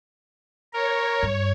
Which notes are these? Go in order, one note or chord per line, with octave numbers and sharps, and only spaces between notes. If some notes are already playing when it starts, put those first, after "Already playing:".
A#4 C#5
G2